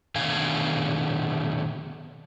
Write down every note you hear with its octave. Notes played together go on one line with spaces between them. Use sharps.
B2 D3 D#3 A3 F5 G#5